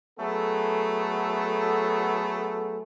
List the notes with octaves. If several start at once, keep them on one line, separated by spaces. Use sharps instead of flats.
F#3 A3 B3 G#4 A4